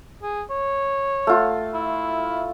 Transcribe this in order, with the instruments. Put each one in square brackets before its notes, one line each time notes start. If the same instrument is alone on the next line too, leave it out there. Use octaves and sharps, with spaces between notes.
[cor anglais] G#4
C#5
[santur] A3 F4
[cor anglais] E4